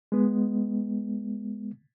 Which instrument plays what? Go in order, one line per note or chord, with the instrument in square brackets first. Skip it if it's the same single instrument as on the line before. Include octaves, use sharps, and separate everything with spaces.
[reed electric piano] G#3 B3